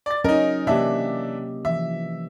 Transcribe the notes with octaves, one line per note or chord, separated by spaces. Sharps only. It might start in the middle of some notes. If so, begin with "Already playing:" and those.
D5 A6
F#3 C#4 D#4 A#4 D#5
C3 E3 A#3 D4 G4 E5
E3 F3 E5